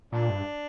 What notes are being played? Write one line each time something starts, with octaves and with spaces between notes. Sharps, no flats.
A#2 D4
G2